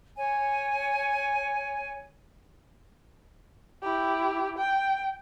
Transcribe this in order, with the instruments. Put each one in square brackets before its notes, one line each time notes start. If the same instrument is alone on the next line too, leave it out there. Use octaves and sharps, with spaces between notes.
[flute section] C#5 G#5
[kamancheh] E4 G4
G5